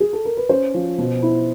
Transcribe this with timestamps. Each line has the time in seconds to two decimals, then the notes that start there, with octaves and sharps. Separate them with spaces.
0.00 G#4
0.13 A4
0.25 A#4
0.37 B4
0.49 C#4 C5
0.74 F3
0.98 B2
1.23 E4